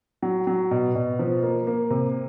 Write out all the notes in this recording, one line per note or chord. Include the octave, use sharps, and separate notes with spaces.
F#3
F#3
B2
B2
F3
A#3
A#3
C3